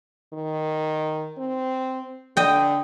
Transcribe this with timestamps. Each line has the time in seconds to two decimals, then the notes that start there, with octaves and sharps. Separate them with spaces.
0.33 D#3
1.38 C4
2.37 D3 D#5 G5